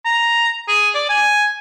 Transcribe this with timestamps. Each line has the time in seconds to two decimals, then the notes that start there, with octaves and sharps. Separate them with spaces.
0.05 A#5
0.68 G#4
0.95 D5
1.09 G#5